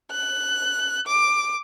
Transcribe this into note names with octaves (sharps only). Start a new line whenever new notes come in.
F#6
D6